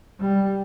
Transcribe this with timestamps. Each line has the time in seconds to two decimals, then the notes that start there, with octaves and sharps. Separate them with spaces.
0.21 G3